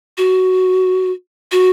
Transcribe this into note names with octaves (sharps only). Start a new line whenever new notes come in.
F#4
F#4